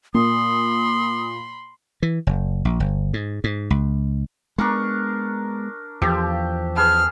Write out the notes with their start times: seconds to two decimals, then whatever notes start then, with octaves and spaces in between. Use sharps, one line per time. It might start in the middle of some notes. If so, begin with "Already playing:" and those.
0.14 A#2 A#3 B5 C6 D#6
2.02 E3
2.27 F#1
2.65 A#1
2.80 G1
3.14 G#2
3.44 G#2
3.70 C#2
4.58 G#3 B3 D4 A#4 C#6
6.02 E2 F3 G4 A4
6.76 G#4 B4 A5 F6